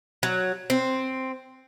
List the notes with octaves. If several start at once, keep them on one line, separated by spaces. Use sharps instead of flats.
F#3
C4